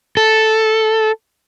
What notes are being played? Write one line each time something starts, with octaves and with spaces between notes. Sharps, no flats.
A4